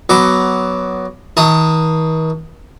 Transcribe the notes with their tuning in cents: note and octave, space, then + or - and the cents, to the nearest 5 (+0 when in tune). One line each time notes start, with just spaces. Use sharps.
F#3 +10 B3 +5 D6 +0
D#3 +45 A5 +40 D#6 +0